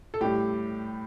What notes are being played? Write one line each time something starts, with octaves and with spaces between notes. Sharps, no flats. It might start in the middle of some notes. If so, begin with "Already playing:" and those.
A4
A2 G3 G4